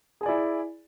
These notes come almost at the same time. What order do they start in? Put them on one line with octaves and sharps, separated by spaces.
G#4 G#5 D5 E4